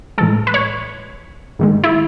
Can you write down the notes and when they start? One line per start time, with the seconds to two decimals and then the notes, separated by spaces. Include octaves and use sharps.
0.18 A2 E3 G#3 A4
0.47 B4
0.54 C#5
1.59 G#2 D#3 G#3
1.84 E4